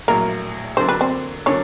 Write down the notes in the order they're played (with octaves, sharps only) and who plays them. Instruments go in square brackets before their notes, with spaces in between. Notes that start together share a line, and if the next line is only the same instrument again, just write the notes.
[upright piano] A#1 A2 F#3 [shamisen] A#3 A#4
[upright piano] D3 F#3 A#3 D4 [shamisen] C5
[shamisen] B4
C4 C5
[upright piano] D3 F#3 A#3 D4 [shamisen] C#4 C#5